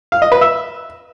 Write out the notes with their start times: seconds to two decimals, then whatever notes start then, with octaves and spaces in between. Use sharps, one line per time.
0.12 F5
0.22 D#5
0.32 B4
0.41 E5